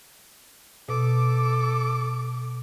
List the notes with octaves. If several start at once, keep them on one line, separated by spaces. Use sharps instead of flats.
B2 A4 D6